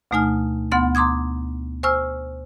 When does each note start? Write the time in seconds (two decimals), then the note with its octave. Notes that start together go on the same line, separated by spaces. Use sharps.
0.11 D2 B2 A3 D#4 G#5 F6
0.72 D2 B3 F#5 C6 A6
0.95 A#5 C6 D6 D#6 G#6
1.83 C5 G#5 C#6 E6 F6